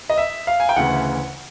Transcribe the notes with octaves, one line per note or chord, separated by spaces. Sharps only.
D#5
E5
F5
G#5
G5
D2 C#3 E3 F#5